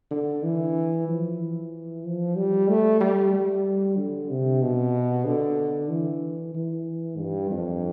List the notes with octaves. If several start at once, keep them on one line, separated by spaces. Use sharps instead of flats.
D3
E3
F3
E3
F3
G3
A3
G3
G3
D3
C3
B2
D3
E3
E3
G2
F2